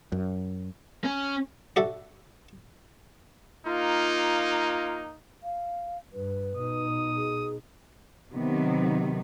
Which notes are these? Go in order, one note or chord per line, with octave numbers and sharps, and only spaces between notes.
F#2
C#4
D4 F#4 A4 E5
A#3 D#4 F4
F5
G2 B4
B2 D#4 D#6
G#4
C3 D#3 F#3 B3